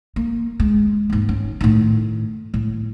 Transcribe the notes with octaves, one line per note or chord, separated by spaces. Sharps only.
A#3
G#3
D#2 G#2
C#4
A2 D#3
A2